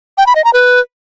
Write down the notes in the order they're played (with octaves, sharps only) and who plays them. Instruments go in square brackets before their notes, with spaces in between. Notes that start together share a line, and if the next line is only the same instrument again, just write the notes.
[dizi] G5
B5
D#5
A#5
B4